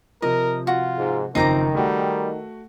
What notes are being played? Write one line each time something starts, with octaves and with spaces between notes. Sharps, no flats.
C3 F3 A#4 D#5
F4 F#4
G#2
F#1 D#3 F3 C4 D#4 A#5 D6 C7
G3 A3 F#4